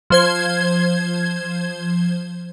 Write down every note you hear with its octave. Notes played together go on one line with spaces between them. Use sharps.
F3 C5 G#6